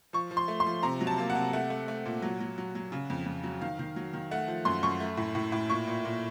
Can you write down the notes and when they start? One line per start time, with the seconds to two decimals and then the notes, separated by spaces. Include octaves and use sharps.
0.13 F3 C#6
0.31 F3
0.37 C6
0.48 A3
0.60 C6
0.67 F3
0.83 C3 A#5
1.01 F#3
1.07 A5
1.18 A#3
1.30 F#5
1.35 C3
1.53 A3 F#5
1.70 A3
1.88 A3
2.05 A#2
2.22 F#3
2.40 F#3
2.58 F#3
2.75 F#3
2.92 C#3
3.10 F2
3.26 F2
3.44 F#3
3.61 D#3 F5
3.79 D#3
3.96 F#3
4.13 D#3
4.31 A3 F#5
4.48 F3
4.65 F#2 C6
4.83 F#2 C#6
5.00 A3
5.17 A2
5.35 A2
5.52 A2
5.70 A#2 C#6
5.87 A#2
6.05 A#2